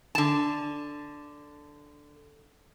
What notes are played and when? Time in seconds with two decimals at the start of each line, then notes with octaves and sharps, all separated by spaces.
0.15 D3 A5